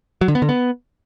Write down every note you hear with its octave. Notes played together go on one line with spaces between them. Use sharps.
F#3
D3
B3
D3
B3